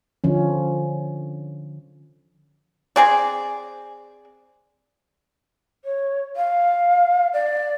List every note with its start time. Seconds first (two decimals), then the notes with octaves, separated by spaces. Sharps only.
0.24 D3 F3 C#4
2.96 C4 G#4 D5
5.85 C#5
6.36 F5
7.33 D5